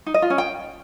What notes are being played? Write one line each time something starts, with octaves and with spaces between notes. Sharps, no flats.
D#4
D#5
F4
C#4
G5